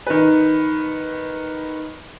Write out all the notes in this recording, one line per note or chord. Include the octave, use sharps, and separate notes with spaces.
D#3 B4